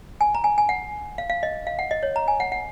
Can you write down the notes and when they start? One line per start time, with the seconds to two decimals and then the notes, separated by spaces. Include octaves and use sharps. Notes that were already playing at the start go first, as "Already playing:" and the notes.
0.21 G#5
0.35 A#5
0.44 G#5
0.58 G#5
0.69 F#5
1.18 F5
1.30 F5
1.43 D#5
1.67 F5
1.79 F#5
1.91 D#5
2.03 C#5
2.16 A#5
2.28 G#5
2.40 F#5
2.52 F#5